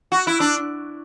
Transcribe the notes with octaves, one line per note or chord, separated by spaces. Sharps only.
F#4
E4
D4